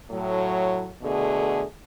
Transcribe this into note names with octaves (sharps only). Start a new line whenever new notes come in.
A2 F#3
B2 D3 A3 G#4